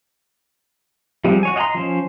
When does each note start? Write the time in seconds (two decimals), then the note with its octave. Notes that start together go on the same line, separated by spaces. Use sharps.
1.24 F3 G3 G#3 C4
1.43 F#4 C#5 G#5
1.56 D#5 F5 F#5 A#5 C6
1.75 F3 C#4 C5